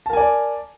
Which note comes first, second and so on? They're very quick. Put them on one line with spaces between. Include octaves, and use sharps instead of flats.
A5 A#4 G#5 D5